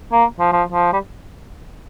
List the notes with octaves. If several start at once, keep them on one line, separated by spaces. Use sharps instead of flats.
A#3
F3
F3
F3
G3